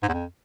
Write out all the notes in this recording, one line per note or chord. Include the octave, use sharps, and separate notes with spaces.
G#2
E2
F2